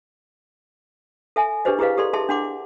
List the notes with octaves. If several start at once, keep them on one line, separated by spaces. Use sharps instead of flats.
A4 E5 G#5
D4 G4 G#4 B4 C5 D#5
E4 G4 G#4 B4 D#5 F5
G4 A4 D5 C6
G#4 D#5 E5 A5 C6
D4 F#5 C6 D6